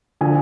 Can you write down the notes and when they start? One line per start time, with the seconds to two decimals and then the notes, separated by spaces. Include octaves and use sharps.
0.21 D3 F3 G#5